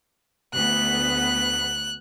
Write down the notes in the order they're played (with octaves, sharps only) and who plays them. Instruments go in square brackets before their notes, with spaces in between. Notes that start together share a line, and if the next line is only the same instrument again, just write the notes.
[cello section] D2 B3 [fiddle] F#6